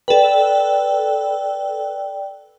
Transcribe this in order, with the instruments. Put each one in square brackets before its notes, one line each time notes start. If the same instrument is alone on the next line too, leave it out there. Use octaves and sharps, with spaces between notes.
[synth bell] A4 B4 [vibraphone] D5 G5